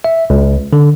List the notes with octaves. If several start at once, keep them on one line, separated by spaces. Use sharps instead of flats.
E5
C#2
D3